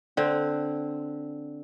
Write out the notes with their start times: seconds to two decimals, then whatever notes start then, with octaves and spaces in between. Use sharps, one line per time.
0.17 D3 C4